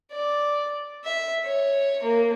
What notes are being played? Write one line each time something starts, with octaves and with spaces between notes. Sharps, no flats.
D5
E5
C#5
A#3